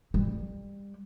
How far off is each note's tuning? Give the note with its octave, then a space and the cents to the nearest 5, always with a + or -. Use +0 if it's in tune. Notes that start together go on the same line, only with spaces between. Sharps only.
G3 +25